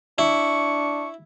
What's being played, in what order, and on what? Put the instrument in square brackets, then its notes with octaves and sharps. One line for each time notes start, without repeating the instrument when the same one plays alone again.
[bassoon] D4 [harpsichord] E4 [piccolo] C#6